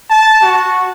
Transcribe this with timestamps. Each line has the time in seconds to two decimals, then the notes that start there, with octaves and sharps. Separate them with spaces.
0.10 A5
0.42 F#4